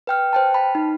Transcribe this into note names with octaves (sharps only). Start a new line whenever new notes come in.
B4 G5 F6
C5 G5 A5
A5 B5
D#4